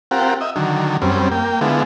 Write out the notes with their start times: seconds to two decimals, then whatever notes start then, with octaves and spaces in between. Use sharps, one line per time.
0.11 C4 F4 G4 A#4 F#5
0.41 D#5 E5
0.56 D3 D#3 F#3
1.02 F#2 G3 C4 C#4
1.32 A#3 G5
1.61 D3 G#3 B3 E4 F4